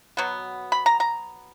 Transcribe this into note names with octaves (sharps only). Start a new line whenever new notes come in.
B2 F#3 B3
B5
A#5
A#5